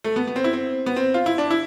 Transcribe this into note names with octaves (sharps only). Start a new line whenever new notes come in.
A3
B3
B3
C4
E4
C4
B3
C4
F4
E4
D4
E4